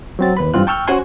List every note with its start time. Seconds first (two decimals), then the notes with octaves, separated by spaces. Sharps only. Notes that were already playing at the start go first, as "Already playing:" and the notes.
0.19 F#3 C4 A6
0.37 D#2 B4 B5
0.54 G2 E3 C4 F4 F#6
0.67 G5 A5 C#6 E6 F6 G6
0.87 C#4 F#4 C5 F#5 G#5 C6